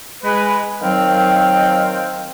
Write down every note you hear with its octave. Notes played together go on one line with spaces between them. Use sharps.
G#3 B4
D#3 F#3 C4 F5 G5